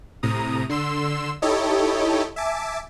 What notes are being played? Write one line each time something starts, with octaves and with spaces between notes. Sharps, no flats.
A2 C3 A#5 D#6
D3 C6 E6 E7
D#4 E4 G4 A4 C#5 D#5
E5 G#5 A5 D6